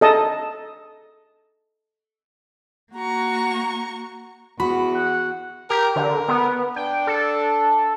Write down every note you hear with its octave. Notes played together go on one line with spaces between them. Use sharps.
A4 D#5 A5
A#3 F#4 A#5 C#6
E2 B3 F#4 B5
F#5
G4 A#4
D3 A#4
B3
D4 G5
A4